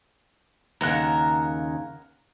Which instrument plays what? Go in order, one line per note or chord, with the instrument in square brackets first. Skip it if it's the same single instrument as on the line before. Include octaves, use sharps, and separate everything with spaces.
[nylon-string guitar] D#2 C#3 [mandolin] A#4 F#5